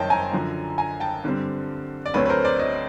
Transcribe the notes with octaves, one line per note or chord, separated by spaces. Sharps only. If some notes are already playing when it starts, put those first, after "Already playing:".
Already playing: F#1 F#2 D#3 C5 C#5 D#5 G5 A5
G#5 A#5
F#2 D3 F3
G#5 A#5
G5 A5
G2 D3 G3 C4
D5
D2 D3 F#3 A3 C4 B4 C#5
B4
A#4 C5
C5 D5
C#5 D#5